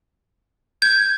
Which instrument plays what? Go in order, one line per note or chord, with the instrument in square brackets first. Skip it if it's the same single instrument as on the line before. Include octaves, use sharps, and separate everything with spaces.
[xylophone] G6 [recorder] G#6